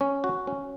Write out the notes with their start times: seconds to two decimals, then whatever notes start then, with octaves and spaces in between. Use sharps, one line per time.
0.01 C#4
0.24 F#4
0.47 C#4